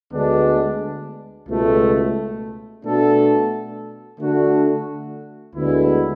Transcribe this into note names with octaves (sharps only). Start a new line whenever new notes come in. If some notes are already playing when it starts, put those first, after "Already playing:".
D2 D3 G#3 B3 D4
C#2 B2 A3
B2 A3 D4 F#4 A4
D3 A3 D4 F#4 A4
D2 D3 G#3 B3 E4